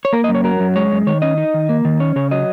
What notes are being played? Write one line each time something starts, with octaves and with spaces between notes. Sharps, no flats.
C#5
A#3 A#4
D#5
F#2
C#5
F#3 A#4
F#2
G#3 C#5
F#2
D#3 C#5
C#4 D#5
D#4
D#3
A#3
D#3
C#4 C#5
C#3 C#5
F#3 D#5